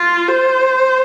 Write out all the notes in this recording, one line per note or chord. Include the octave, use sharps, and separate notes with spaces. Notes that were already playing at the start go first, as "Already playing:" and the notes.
Already playing: F4
C5